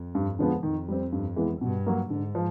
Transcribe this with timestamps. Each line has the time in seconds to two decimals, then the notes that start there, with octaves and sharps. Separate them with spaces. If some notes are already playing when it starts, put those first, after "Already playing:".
Already playing: F2
0.15 G2
0.39 D3 F3 G#3 B3
0.63 F2 D#3
0.88 G3 C4
1.12 G2
1.36 E3 G#3 B3
1.61 G2 B2
1.86 F#3 A#3
2.10 G#2 D3
2.35 F3